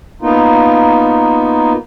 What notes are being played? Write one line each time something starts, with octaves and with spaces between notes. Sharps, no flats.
A#3 B3 D#4 F4